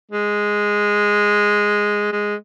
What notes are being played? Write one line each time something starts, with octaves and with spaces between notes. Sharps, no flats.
G#3
G#3